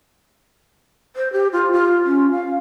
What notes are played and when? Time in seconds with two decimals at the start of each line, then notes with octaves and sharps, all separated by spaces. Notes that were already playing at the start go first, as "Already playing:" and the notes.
1.16 C5
1.33 G4
1.53 F4
1.72 F4
2.06 C#4
2.31 F5